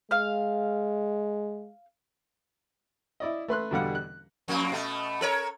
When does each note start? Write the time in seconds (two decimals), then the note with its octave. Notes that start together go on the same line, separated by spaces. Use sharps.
0.11 G#3 F5 F6
3.20 E4 D5 D#5
3.48 A3 B4 C6 F#6
3.71 E2 B2 D3 G3 F5 F#5
3.95 F#6
4.48 F2 A#3
4.72 B2 A3
5.21 A4 A#4 C#5